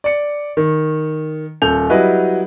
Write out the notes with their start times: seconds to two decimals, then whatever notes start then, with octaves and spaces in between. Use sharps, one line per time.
0.04 D5 C#7
0.57 D#3
1.62 D#1 A4 G6 F7
1.90 F#3 G3 E4 B4 D#5